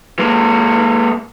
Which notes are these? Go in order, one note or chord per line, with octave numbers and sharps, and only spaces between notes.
G#3 A#3